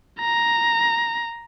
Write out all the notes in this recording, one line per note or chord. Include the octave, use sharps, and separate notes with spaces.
A#5